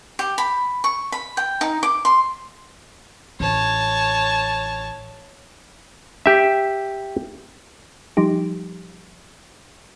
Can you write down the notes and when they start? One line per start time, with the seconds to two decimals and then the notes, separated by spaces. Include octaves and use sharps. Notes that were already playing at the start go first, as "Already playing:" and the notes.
0.19 G4
0.38 B5
0.84 C#6
1.12 B5
1.37 G5
1.61 D#4
1.83 D6
2.05 C6
3.40 A1 C#5 A5
6.26 G4 E5
8.17 F3 G3 D#4 G4